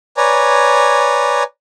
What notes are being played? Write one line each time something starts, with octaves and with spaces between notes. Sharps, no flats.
B4 C#5 D5 G#5 A#5